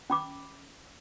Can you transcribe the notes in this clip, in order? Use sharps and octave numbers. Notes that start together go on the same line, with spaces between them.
C#4 B5 D6